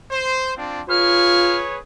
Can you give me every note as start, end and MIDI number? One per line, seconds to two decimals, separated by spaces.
0.11 0.52 72
0.57 0.82 60
0.57 0.82 62
0.57 0.82 65
0.89 1.65 65
0.89 1.79 68
0.89 1.79 71
0.89 1.79 73
0.89 1.57 89